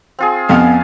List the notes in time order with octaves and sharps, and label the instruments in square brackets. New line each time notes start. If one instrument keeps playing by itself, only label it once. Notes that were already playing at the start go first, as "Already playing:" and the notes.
[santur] C4 F4 G#4
[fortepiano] F2 F5 G5 [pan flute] B3